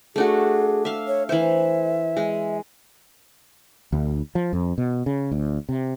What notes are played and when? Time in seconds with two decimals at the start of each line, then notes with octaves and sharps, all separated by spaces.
0.16 A3 D4 F#4 G#4
0.85 E5 F5
1.08 C#5
1.29 E3 C5 E5
2.17 G#3
3.92 D2
4.35 F3
4.53 F2
4.78 B2
5.06 C#3
5.31 D2
5.69 C3